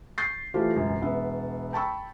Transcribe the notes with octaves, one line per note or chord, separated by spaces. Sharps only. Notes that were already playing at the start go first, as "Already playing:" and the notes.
C#6 G6 A6 C7
E3 A3 F4 G4 C5
E1 C#2 F#2
E1 B3 E5
G5 A5 B5 C#6 E6